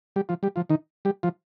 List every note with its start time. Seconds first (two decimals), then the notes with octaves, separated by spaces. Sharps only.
0.16 G3 G4
0.29 F3 F4
0.43 G3 G4
0.56 F3 F4
0.70 D#3 D#4
1.05 G3 G4
1.23 F3 F4